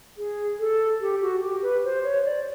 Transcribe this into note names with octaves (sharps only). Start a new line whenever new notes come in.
G#4
A4
G4
F#4
G4
B4
C5
C#5
D5